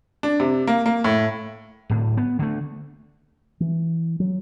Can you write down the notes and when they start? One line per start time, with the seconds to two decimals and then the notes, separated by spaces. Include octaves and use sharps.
0.23 D4
0.40 C3
0.67 A#3
0.86 A#3
1.04 A2
1.90 D1 A2
2.17 B3
2.39 D3 A3
3.60 E3
4.20 F#3